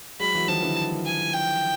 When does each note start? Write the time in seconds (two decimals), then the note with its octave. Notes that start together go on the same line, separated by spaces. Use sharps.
0.20 F#3 G#3 B5
0.34 E3 F#3
0.48 D#3 F3 A5
0.62 D3 E3
1.06 G#5
1.33 G5